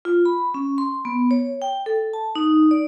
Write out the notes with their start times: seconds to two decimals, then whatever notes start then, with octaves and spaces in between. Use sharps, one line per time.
0.05 F4
0.26 B5
0.54 C#4
0.78 C6
1.05 B3
1.31 C#5
1.62 G5
1.86 A4
2.13 A5
2.35 D#4
2.71 D5